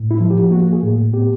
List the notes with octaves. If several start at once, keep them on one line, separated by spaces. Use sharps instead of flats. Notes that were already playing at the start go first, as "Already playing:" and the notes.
Already playing: A2
E4
F3
G4
A#3 F#4
G#4
A2
B3 G4